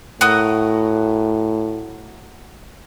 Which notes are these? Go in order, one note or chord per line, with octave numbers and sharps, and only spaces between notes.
A2 F#4 A#4 D#6